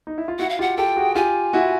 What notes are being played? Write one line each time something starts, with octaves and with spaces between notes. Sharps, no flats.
D#4
E4
F4
E4 F#4 F#5
F5
F4 G4 F#5
G4 A4 G5
F#4 G#4
F4 G4 G#5
E4 F#4